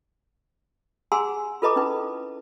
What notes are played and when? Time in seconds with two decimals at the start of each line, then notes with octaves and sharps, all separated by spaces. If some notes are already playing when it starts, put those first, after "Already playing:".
1.12 G#4 F#5 G#5 A#5 C6 E6
1.62 F4 A4 B4 D#5 A#5 D6
1.76 C#4 D#4 E4 B4